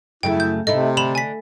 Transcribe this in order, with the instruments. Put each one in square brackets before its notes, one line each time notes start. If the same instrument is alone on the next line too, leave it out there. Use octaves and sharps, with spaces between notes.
[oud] F#2 C#3 A3 [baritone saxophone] E4 [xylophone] G5
[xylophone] G6
[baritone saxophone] C3 [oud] A3 D#4 E4 [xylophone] D#5
[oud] D3 [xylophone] B5 E7 F7
[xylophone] G#5 B6